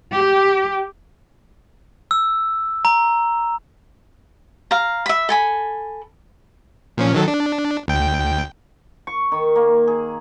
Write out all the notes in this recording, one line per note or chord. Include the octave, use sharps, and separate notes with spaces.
G4
E6
A#5
F5 A#5
E5 B5
A4 G#5 B5
A#2 F3 C#4
D#3 F#3 A4
D4
D2 G5
C#6
D#3
A#3
G#4